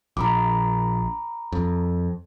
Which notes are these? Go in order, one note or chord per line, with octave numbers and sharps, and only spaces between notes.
A#1 A#5 B5 D6
F2